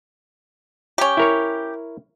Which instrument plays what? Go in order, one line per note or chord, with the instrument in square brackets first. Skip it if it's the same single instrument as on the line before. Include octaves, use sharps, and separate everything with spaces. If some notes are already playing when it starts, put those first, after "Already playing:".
[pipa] C#4 G4
[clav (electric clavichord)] E4 A#4 C#5